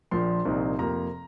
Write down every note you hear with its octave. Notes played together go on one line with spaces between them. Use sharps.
A#1 A#2 F3 C6
C2 A#2 F3 C4 D#4
F2 C3 F3 A#3 A#5